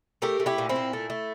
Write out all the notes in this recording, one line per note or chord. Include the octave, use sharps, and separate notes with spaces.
A3 G4 A#4
A3
E4 G4
A#2
C4 E4
A#2
A3
A3